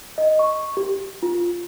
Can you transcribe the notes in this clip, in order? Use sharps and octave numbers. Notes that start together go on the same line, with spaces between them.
D#5
C#6
G4
F4